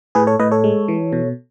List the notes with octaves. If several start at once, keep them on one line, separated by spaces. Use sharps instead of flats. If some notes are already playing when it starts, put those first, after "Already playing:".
A2 G#4 B4
A4 C#5
A2 B4 D#5
A4 C#5
G#3
E3
B2